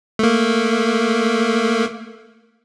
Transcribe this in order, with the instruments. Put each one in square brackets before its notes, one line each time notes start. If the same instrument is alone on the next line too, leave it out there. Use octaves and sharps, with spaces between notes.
[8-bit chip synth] A3 A#3